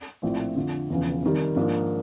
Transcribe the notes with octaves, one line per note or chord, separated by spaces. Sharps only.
A#1 A2 F3 A3 C4
F2 D3 F3
E1 E2 C#3 F3
F2 C3 D#3 G3
G#2 F3 A#3 D4